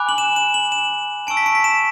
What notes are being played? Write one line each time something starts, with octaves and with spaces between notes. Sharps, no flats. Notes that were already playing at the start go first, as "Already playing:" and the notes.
Already playing: G#5 B5 D6 F#6
F#7
E7
E7
F#7
E7
A5 C#6 E6 D7
B6
D7
B6
E7